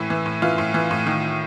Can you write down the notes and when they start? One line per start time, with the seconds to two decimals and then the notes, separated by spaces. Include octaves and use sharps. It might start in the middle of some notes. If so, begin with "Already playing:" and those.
Already playing: A2 E3 E4
0.10 E3
0.26 A2
0.42 E3 F4
0.58 A2
0.74 E3
0.91 A2
1.06 D#3